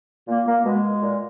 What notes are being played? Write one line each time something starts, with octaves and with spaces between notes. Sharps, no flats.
A#2 A#3
A#3
B2 G#3
A#2